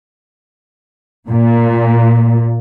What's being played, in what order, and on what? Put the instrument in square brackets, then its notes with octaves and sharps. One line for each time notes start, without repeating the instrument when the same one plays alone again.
[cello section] A#2